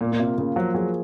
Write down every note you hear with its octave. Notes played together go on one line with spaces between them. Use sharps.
A#2 A#3
A#2
C3 F4
C#3 A#3
F3 F#3
F#3 G#4